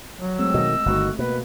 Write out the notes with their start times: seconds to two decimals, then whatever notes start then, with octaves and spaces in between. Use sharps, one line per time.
0.21 F#3
0.38 G#3 A3 C4 E6
0.54 B2 D#3 D#5
0.86 G1 B2 D#3 A3 F#4
1.19 B2 A#3 B4